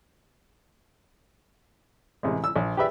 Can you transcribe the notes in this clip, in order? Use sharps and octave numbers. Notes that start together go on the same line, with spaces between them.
A1 C3 G#3
E6
A#1
G4 G#4 B4 D5 E5